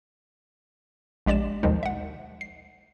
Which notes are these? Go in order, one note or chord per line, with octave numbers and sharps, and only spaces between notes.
A#1 G#3 G4 D5 D6 E7
D#2 B2 D#3 F3 G#3 D#4
E5 F#5
C7